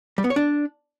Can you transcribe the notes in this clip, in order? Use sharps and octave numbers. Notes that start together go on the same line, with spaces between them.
G3
B3
C#5
D4